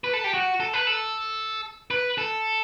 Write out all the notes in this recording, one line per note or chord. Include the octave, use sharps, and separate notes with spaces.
B4
A4
G4
F#4
A4
B4
A4
B4
A4